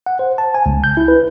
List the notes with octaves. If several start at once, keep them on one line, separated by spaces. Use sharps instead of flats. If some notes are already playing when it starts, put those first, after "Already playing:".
F#5
C5
A5
G#5
C#2
G6
E4
B4